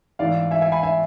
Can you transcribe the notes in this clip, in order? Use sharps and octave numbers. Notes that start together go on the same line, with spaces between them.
A1 G#2 E3 D5 F5
E5 G#5
E5 G#5
G#5 B5
E5 G#5